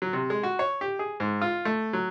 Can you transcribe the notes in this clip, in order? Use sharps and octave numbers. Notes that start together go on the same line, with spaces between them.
F#3
C3
G#3
F#4
C#5
G4
G#4
G#2
F4
A3
F#3